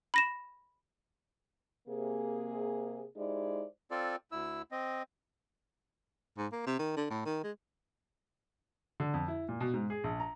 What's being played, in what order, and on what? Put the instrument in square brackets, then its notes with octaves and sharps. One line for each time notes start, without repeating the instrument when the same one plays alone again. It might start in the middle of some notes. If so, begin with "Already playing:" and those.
[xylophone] B5 A#6 E7
[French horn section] C3 A#3 G#4
G#3 D#4 E4 G4 C5 D5
[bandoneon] C4 F4 A4 D5
D2 E4 E6
C4 D#5
[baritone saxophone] G#2
A#3
C3
D#3
D3
A2
D#3
G#3
[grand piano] D3
F2
E4
A#2
B2
G#2
G#4
A#1
A#5